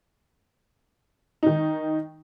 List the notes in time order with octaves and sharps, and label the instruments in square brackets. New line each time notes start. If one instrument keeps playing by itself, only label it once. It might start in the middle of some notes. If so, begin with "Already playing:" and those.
[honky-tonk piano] D#3 D#4